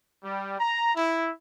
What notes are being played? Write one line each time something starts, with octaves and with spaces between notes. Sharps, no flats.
G3
A#5
E4